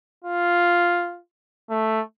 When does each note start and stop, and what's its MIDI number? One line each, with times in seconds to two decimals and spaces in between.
0.24 1.19 65
1.70 2.01 57